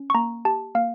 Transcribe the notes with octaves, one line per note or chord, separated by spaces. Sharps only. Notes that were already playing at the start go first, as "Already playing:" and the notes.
Already playing: C#4
C#6
A#3 A#5
G4 A5
A#3 F5